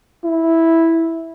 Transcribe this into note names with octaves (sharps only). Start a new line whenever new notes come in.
E4